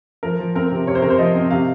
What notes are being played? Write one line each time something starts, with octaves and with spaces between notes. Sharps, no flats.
F3 A#4
F3
C4 A#4
C3
C3 C#5
C5
C3 A#4
C5
F3 D#5
C4
C3 F5